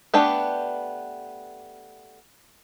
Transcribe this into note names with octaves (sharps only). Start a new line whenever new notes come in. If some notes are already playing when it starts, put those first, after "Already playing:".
A3 B3 D4 G4 B4